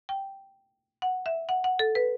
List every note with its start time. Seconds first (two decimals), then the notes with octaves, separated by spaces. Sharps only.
0.09 G5
1.02 F#5
1.26 E5
1.49 F#5
1.64 F#5
1.79 A4
1.95 B4